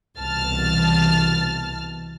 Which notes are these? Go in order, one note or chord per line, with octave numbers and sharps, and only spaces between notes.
C2 B2 E3 A5 F6 A6